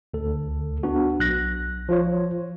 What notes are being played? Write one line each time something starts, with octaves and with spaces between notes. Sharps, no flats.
D2 A4
B3 D4 F#4
B1 F#6 A#6
F3 F4 C#5